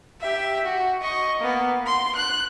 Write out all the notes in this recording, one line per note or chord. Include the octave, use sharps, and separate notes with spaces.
G4 E5
F#4
D#5 C#6
A#3 B3
C6
F#6